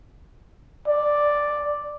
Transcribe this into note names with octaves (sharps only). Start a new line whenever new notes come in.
D5